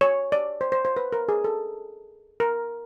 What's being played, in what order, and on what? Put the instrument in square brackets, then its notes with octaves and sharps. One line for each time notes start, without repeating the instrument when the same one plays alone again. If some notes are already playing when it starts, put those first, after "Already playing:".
[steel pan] C#5
D5
C5
C5
C5
B4
A#4
G#4
A4
A#4